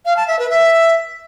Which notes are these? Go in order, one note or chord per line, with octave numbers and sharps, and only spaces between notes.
F5
A5
E5
B4
E5